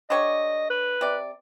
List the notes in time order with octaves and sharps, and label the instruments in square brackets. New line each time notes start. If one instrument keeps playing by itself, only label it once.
[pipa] D3 G4 C#5 [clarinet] D#5
[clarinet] B4
[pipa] C3 D5